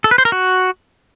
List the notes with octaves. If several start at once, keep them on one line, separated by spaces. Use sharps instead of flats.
A4
B4
C5
A#4
F#4